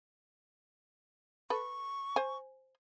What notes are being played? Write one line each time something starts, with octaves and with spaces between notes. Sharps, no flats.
A4 B4 C#6
C5 G#5